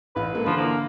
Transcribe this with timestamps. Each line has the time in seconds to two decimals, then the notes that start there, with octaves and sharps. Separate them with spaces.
0.16 A1 B4 F5
0.33 G#3 A#3 A4
0.46 D3 E3 F3
0.57 A#3